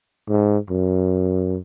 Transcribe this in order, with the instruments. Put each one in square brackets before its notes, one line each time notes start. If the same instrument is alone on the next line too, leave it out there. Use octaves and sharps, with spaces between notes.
[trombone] G#2
F#2